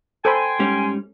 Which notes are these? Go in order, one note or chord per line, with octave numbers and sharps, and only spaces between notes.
A4 C5 G5 G#5 B5 C6
G#2 G3 C#4